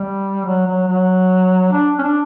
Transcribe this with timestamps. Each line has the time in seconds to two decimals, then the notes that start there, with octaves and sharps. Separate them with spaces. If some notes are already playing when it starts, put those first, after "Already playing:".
Already playing: G3
0.45 F#3
0.67 F#3
0.87 F#3
1.72 D4
1.99 C#4
2.03 D4